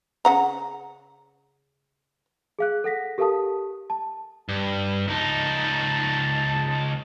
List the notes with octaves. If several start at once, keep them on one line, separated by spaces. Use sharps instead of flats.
C#3 F#5 A#5
G#4 F5 F#6
A4 F#5 A#6 B6
G4 A4 A#4 F5 A5 D#6
A5
G2
C#2 D#4 A5